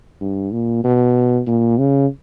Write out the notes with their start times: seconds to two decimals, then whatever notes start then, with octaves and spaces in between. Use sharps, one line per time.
0.21 G2
0.53 A#2
0.84 B2
1.47 A#2
1.78 C#3